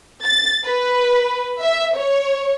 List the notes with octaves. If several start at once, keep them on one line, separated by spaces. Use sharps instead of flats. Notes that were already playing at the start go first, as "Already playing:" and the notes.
A6
B4
E5
C#5